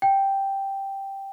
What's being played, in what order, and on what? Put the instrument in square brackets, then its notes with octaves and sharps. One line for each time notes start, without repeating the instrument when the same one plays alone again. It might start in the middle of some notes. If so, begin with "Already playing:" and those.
[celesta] G5